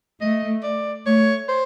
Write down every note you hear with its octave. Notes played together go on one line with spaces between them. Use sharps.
A3 D#5
D5
A3 C#5
C5